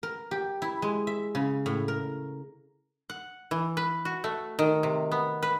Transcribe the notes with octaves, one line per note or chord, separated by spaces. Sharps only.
A#4
G4
E4
G#3
E5
C#3
A2
A#4
F#5
E3
B4
F#4
A3
D#3
C3
B3
B4